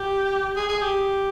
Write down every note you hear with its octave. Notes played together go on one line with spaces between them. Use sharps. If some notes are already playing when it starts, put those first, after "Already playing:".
Already playing: G4
G#4
G#4
G4